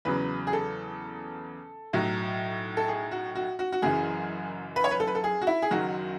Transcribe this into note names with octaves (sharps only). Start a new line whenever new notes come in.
E2 C#3 F#3 B4
G#4
A4
B1 A2 F#3
A4
G#4
F#4
F#4
F#4
F#4
F#1 F#2 E3 G#4
B4
C#5
B4
A4
B4
A4
G#4
F#4
E4
G#4
F#1 F#2 D#3 F#3 F#4